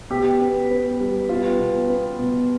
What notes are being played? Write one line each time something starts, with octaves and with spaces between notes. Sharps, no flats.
B2 G4
B3
B3
G3
B3 F4
B2
B3
B2